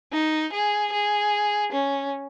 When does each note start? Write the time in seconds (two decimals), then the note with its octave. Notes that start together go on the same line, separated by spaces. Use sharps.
0.12 D#4
0.53 G#4
0.92 G#4
1.72 C#4